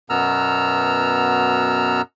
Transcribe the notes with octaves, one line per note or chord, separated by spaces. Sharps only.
F#2 B2 B3 A#5 E6 F6